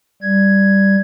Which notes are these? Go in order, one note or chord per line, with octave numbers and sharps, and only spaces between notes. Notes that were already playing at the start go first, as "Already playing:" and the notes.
G3 G#6